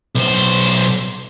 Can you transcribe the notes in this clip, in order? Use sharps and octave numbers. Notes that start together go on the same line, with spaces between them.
B1 C5